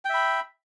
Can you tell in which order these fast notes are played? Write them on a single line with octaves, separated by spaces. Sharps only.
G5 E5 B5